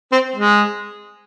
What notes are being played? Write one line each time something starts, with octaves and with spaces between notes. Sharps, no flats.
C4
G#3